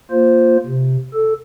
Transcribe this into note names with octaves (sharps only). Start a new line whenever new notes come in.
A#3 F4 C5
C3
A4